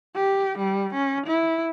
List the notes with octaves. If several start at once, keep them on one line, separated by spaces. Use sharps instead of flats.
G4
G3
C#4
E4